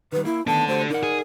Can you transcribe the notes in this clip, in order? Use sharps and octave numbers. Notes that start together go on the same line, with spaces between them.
D#3 G3 B4
A#3 E4
D#3 A3 B3 D4 A4 A5
A3 F#4 G4 C5
D#4 A#4 D5 F#5
G#4